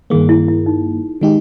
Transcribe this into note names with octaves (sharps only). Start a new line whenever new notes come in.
G2 D#3 A#3 G#4
E4
E4
D#4
D#3 G#3 D#4 G4